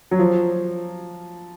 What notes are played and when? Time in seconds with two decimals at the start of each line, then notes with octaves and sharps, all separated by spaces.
0.11 F#3
0.19 F3